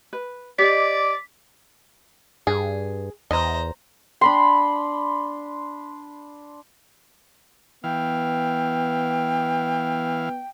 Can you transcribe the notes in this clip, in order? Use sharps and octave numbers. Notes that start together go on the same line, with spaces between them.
B4
G4 D5 D#5 D6 B6
G2 G#4
E2 C5 D#5 A#5
D4 B5 C6
E3 B3 F5 G5